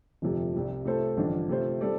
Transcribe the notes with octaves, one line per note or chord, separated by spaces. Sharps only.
G1 F2 C3 F3 A3
C2 C3 G3
C3 A3 F4 A4 C5
A1 G2 D3 F3 D4
C3 A3 F4 C5
G3 C4 A4 D5